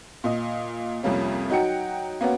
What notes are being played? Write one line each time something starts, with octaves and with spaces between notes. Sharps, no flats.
A#2 D#5
C2 F2 F3 G3 A#3 C#4
F#3 D#4 F#4 G5 C#7
A#3 B3 C#4 F#4